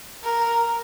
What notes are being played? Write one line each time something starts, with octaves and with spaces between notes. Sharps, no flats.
A#4